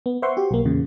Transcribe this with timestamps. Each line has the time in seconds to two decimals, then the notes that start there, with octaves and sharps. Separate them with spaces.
0.06 B3
0.22 B4 C5 E5 F#5 C6 C#6
0.37 F#4 G4
0.51 B1 A#3
0.65 E2 A#2 C#3